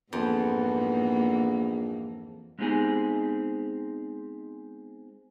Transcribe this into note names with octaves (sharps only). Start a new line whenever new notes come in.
A#1 F2 G#2 E3 A#3 B3
G#3 B3 C4 D#4 G4 G#4